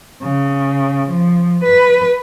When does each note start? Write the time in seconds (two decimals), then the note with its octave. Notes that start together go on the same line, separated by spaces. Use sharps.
0.22 C#3
1.09 F3
1.63 B4